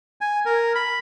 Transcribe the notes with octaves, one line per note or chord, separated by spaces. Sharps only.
G#5
A#4
B5